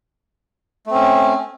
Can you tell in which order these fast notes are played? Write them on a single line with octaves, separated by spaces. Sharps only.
A3 C4 C#4